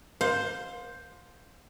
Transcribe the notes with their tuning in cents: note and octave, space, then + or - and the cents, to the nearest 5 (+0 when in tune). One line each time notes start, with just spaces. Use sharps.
C5 +0 F5 +30